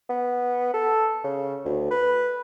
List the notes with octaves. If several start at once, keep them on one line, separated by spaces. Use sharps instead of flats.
B3
A4
C#3
D2
B4